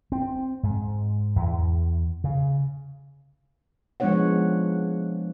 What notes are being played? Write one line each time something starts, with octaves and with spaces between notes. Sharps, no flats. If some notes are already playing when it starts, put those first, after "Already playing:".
C4
G#2
E2
C#3
F3 G#3 B3 D4 C#5 F#5